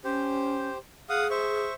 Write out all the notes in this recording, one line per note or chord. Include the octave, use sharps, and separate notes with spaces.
C#4 G4 C5
G#4 F5 F#5 D#6
C5 E5 C#6